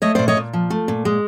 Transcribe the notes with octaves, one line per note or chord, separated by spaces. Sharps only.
A3 C#5 D#5
A#2 C5 D5
C#5 D#5
A#2
F3
A3
A#2
G#3